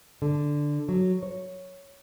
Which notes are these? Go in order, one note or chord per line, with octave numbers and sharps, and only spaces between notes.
D3
F#3
C#5